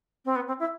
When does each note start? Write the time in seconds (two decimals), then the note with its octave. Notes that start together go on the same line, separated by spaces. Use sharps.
0.25 C4
0.35 B3
0.48 C4
0.59 E4